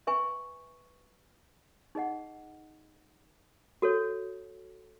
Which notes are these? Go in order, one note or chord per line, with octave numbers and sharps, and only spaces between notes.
B4 E5 G#5 C#6
D#4 G#4 D#5 F#5
F#4 A4 C#5